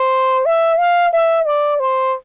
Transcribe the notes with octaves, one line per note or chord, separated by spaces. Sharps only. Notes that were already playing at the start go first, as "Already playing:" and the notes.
Already playing: C5
E5
F5
E5
D5
C5